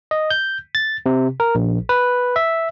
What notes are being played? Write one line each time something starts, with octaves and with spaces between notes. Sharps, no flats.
D#5
G6
A6
C3
A#4
A#1
B4
E5